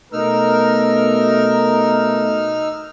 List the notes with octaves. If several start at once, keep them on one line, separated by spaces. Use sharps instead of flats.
B2 A3 D#4 A#4 E6 F6